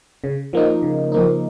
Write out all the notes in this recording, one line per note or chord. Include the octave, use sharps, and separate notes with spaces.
C#3
F3 A#3 D#4
C#3
F3 A#3 D#4